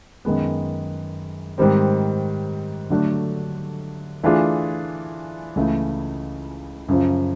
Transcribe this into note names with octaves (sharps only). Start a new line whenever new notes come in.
F#2 D#3 G#3 B3
G#2 D#3 G3 C4
D3 F#3 A3 D4
E3 A3 D4 F4 G#4
C#2 C#3 E3 A3
F#2 C#3 F3